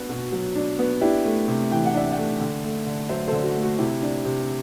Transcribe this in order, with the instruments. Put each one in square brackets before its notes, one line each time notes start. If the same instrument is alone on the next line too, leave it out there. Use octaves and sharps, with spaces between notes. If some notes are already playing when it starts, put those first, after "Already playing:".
Already playing: [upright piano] B3 D4 F#4
B2
F#3
D4
B3
D4 E4 G4
A3
C3
E3 G5
F#5
D4 E5
D5 F#5
A3
D3
A3
D3
F#3 C5 E5
A4 C5
D3
F#4
A3
F#4
C3 E4 G4
D4
C3